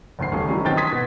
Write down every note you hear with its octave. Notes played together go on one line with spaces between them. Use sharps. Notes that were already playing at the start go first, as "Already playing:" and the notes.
F#1 D2 C6 C7
D#1 B1 C#3 A3 C#4
D#3 E3 F#3 G3 A3 C#4
B1 D#3 C4 G5 A6
C6 D#6 G#6 A6 B6
B2